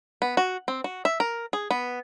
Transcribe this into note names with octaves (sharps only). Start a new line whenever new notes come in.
B3
F#4
C4
F#4
E5
A#4
G#4
B3